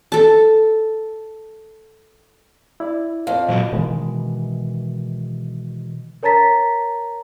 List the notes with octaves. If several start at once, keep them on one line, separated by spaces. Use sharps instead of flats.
A4 A5
E4 D5
F2 F5
A#2 F#3 F#4 C5
B2 D#3 E3 G#3
A#4 C#5 A5 A#5 A6 B6